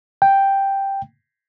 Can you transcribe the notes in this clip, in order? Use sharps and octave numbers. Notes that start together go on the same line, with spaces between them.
G5